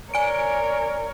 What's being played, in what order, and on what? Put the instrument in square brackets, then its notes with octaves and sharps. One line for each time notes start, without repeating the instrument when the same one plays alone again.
[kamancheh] A#4 C#5 [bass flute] D5 [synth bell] G#5 D7